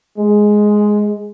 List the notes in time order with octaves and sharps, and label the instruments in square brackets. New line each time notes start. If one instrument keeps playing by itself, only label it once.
[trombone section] G#3